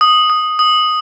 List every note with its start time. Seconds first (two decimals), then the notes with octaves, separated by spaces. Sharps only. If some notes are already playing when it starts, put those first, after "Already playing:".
0.01 D#6
0.30 D#6
0.59 D#6